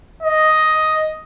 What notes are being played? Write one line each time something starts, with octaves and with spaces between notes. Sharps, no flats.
D#5